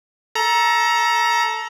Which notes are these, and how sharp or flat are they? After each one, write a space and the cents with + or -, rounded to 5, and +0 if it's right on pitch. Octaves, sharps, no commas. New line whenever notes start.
A4 +0 A#5 +20